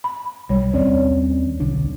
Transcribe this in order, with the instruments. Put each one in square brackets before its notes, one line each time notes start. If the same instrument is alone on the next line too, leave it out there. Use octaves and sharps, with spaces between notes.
[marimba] B5
[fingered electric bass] B1 [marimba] G3 C#5
[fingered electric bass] D#2 C4 C#4 [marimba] C#5 D5
[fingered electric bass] B1 D3 D4